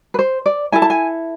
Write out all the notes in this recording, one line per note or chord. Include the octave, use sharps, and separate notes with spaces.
B4
C5
D5
E4 A4 G#5
A5
G#5